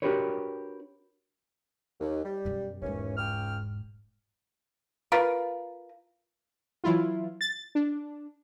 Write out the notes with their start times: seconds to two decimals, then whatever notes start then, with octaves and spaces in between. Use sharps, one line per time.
0.02 D4 F#4 G4 A#4 B4 C#5
2.00 D#2
2.24 G3
2.45 F#2 B2
2.82 E1 D#2 G#2 E3 C#4
3.17 C#2 G5 F6
5.12 F4 A#4 B4
6.84 E3 F#3 E4 F4
7.41 A6
7.75 D4